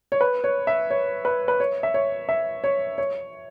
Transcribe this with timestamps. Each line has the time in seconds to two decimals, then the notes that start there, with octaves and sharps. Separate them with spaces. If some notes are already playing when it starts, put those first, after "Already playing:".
0.12 C#5
0.21 B4
0.44 C#5
0.67 E5
0.91 C#5
1.25 B4
1.48 B4
1.60 C#5
1.83 E5
1.94 C#5
2.29 E5
2.64 C#5
2.98 C#5